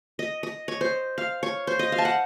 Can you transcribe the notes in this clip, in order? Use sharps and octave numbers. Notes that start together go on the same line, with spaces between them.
D#5
D#5
C#5
C5
F5
C#5
C5
D#5
F5
A5
F#5